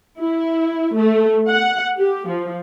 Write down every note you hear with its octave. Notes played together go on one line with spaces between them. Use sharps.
E4
A3
F#5
G4
F3